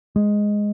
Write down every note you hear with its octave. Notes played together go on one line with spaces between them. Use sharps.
G#3